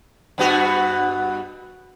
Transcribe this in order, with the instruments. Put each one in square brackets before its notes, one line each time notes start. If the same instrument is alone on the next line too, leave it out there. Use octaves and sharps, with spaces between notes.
[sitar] G2 B3 F#4